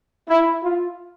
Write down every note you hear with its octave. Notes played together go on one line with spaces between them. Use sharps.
E4
F4